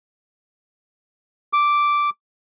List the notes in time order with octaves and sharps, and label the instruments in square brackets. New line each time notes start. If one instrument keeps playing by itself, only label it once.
[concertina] D6